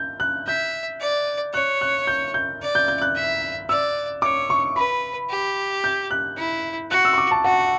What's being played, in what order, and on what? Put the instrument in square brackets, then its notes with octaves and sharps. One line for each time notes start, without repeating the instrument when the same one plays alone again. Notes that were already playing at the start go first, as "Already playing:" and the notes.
Already playing: [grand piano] G6
F#6
[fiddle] E5 [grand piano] G6
[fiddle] D5
[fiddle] C#5 [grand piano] F#6
[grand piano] F#6
G6
G6
[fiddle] D5
[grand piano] G6
G6
F#6
[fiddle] E5
[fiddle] D5 [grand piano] E6
[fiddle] C#5 [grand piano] D6
[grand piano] C#6
[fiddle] B4 [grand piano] B5
[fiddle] G4
[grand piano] G6
F#6
[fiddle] E4
[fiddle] F#4 [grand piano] F#6
[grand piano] E6
C#6
D6
A5
[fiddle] F#4 [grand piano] F#5